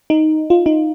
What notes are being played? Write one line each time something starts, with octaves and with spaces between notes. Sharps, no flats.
D#4
F4
D#4